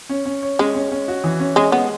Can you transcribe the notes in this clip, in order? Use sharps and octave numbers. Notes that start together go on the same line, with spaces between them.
C#4
C#4
C#5
G#3 C#4
C#4
C#4
F#4
E3
C#4
G#3 C#4
G#3 B3